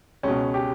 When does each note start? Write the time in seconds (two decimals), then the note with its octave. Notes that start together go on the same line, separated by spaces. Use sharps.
0.23 C#2 B2 C#4
0.54 G4